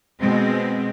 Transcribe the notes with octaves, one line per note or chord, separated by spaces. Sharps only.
B2 G#3 C4